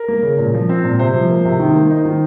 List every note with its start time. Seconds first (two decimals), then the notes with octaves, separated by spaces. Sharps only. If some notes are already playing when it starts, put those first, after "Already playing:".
Already playing: A#4
0.08 A#3
0.23 C#3
0.38 A#2
0.54 F3
0.69 C4
0.84 A#2
0.99 C3 C5
1.14 F3
1.30 A#3
1.45 C3
1.59 D#3
1.75 A#3
1.90 D#4
2.05 D#3